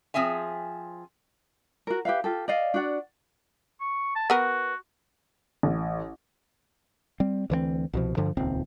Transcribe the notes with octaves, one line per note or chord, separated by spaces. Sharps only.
F3 C4 G#4 E5 G#5
F#4 A#4
G4 B4 E5 F5
F4 G4 A4
D5 D#5 F5
D4 F#4 D5 F#5
C#6
A5
B3 F#4 A#4
A1
G3 C4
D2 E3 A3 C4
C2 B2 F3
G2 D3 F3
D#1 C#2 C4